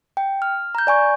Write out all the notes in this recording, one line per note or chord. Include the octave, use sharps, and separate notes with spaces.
G5
F6
A#5 G6
D5 G#5 C#6